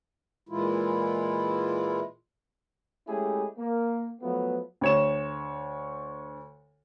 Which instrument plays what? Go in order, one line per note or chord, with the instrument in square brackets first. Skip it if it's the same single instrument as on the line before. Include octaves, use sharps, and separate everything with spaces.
[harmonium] A#2 E3 G#3 E4 F4
[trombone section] G#3 A3 C#4 E4 G4 G#4
A#3
F3 F#3 A3 B3
[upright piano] D2 C#5 E7